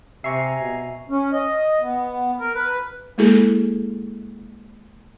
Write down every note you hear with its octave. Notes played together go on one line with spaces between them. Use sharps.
C3 E5 G#5 A#5 C#6 C7
B2
C#4
D#5
B3
A#4
B4
G#3 A#3 E4 G#4 A4